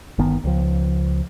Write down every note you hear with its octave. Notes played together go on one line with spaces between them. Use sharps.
G1 D#3 B3
C#2 F3